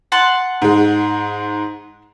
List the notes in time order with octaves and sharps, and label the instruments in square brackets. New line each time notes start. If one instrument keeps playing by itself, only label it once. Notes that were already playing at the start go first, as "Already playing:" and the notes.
[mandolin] F#5 A5 C6
[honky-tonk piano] G#2 G#3